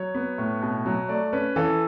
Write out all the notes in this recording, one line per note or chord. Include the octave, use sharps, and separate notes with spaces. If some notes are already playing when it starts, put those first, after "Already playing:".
Already playing: F#3 C#5
B3
A2
B2
F#3
A3 D5
C#4 B4
E3 A4